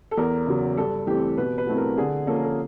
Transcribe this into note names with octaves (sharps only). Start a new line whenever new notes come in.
A4
E2 A#4
C#3 F#3
G2 A4
E3 A3 C4 G4
B2 B4
B4
F#3 A3 C4 E4
A#4
D3 G#4
F3 A#3 C#4 A4
A#4
A4